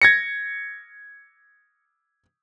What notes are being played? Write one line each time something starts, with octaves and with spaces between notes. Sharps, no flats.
G#6 A#6 C#7